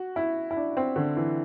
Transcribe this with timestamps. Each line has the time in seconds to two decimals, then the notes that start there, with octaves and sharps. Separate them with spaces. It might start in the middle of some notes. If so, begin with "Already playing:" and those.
Already playing: F#4
0.16 E4
0.51 E4
0.57 D4
0.77 C4
0.96 D3
1.17 E3